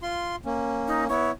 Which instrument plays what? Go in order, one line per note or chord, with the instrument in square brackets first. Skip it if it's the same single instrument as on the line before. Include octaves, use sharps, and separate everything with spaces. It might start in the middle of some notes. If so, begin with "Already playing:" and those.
[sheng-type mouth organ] F4 C6
A#3 C#4
[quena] D#4
[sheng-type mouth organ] B3 E4 [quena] C#5